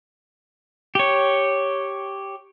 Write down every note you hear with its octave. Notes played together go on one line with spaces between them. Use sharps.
G4 C#5